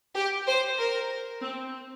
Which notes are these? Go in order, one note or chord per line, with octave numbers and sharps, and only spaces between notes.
G4
C5
A#4
C4